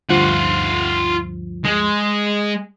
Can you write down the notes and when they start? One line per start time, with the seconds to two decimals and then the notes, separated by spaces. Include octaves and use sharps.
0.09 D2 G2 F3 F4 F#5
1.65 G#3